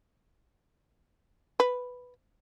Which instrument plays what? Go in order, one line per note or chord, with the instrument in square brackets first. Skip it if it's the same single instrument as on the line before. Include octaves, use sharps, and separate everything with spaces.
[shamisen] B4